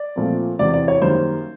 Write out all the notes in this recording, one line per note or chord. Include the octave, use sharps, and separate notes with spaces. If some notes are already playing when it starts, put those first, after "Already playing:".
Already playing: D5
A#2 F3 A3 C4
E2 C3 E3 D5
D5
C#5
F#2 D#3 G3 A#3 C5